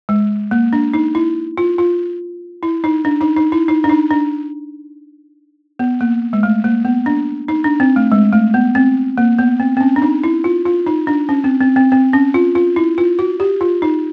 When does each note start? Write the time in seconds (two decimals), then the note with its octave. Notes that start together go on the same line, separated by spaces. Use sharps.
0.09 G#3
0.51 A#3
0.73 D4
0.94 D#4
1.15 E4
1.58 F4
1.78 F4
2.63 E4
2.84 D#4
3.05 D4
3.21 D#4
3.37 D#4
3.52 E4
3.68 D#4
3.84 D4
3.89 D#4
4.11 D4
5.79 B3
6.01 A#3
6.33 G#3
6.43 A3
6.64 A#3
6.85 B3
7.06 D4
7.48 D#4
7.64 D4
7.80 C4
7.96 A3
8.12 G#3
8.33 A3
8.54 B3
8.75 C4
9.18 A#3
9.39 B3
9.60 C4
9.77 C4
9.81 C#4
9.96 D4
10.02 D#4
10.24 E4
10.44 F4
10.66 F4
10.87 D#4
11.07 D4
11.29 C#4
11.44 C4
11.61 C4
11.76 C4
11.92 C4
12.13 C#4
12.34 F4
12.55 F4
12.76 E4
12.98 F4
13.19 F#4
13.40 G4
13.61 F4
13.82 D#4